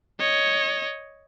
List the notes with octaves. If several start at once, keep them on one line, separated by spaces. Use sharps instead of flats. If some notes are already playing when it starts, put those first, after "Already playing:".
C#5 D#5